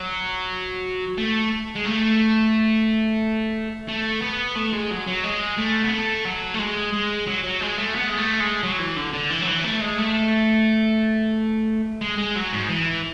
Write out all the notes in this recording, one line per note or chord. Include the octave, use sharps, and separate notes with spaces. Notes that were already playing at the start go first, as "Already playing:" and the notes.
Already playing: F#3
A3
G#3
A3
A3
B3
A3
G#3
F#3
F#3
G#3
A3
B3
A3
F#3
A3
G#3
G#3
F#3
F#3
G#3
A3
B3
G#3
A3
G#3
F#3
E3
D3
D3
E3
F#3
E3
A3
G#3
A3
G#3
G#3
F#3
G#2
E3